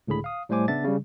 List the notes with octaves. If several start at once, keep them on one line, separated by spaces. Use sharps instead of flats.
C#2 A2 D3 G#4 B5
F5 D#6
A2 G3 A3 C5 G#5 D6
C#3 B3 D4 E5 A6
C#3 G3